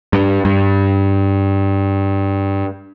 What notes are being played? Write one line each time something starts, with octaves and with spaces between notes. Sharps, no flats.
G2
G2